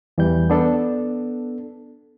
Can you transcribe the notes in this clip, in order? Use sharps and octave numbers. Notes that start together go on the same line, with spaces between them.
E2 E3 G3 G6
B3 D4 A4